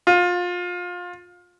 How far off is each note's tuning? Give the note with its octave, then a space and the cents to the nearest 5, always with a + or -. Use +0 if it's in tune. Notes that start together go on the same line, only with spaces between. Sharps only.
F4 +25